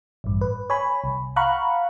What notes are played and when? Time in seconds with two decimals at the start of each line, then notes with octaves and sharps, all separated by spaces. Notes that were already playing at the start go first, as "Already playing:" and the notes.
0.24 A1 G2
0.41 B4
0.70 C#5 G#5 B5
1.04 C2
1.36 F5 F#5 A#5 B5 C#6 F#6